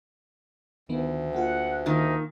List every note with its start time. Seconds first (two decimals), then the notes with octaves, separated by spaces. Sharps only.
0.89 D2 D#3 F3 B3
1.34 A#3 F4 G#4 F#5
1.86 A#2 D#3 D#4